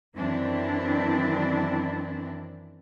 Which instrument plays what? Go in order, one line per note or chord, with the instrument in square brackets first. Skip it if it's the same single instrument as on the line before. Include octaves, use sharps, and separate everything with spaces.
[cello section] F#2 D#3 E3 C4 D4 E4